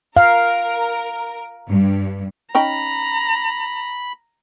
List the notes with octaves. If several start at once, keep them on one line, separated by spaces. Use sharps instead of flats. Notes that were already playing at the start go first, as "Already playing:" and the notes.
A#4 F5
G2
C#4 D#4 G5 A#5 B5